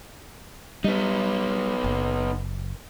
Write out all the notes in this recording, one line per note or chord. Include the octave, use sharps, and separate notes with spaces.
G3 B3 D#4
F#1